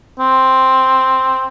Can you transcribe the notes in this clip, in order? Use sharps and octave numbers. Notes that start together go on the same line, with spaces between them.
C4